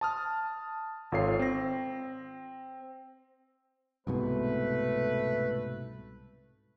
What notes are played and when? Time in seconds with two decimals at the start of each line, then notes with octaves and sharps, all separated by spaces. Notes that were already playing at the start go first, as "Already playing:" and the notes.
0.01 A5 D#6 F6
1.12 G#1 F4 A4 C#5 C7
1.39 C4 A#6
4.07 C2 G#2 B2 A3 B4